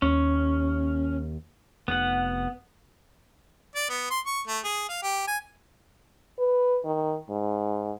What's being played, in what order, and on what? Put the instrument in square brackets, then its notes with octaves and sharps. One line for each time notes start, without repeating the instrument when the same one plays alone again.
[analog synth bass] D#2 [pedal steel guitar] C#4
[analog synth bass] F1 [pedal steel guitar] B3 F#5
[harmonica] D5
B3
C6
C#6
A3
G#4
F5
G4
G#5
[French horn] B4
D#3
G#2